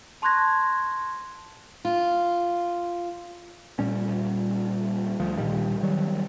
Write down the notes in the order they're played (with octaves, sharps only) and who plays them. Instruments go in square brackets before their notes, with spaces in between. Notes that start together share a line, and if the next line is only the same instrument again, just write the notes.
[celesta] A5 C6 C#6 F#6 G#6 A#6
[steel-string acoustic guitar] F4
[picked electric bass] A#2 G3 C#4
D2 F3
A#1 A#2 D#3 G3
D#3 F#3 G3